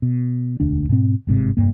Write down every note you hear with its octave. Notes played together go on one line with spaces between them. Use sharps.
B2
E1 D2 D4
G#2 B2 C4
G1 G#2 C3
F1 G2 A#3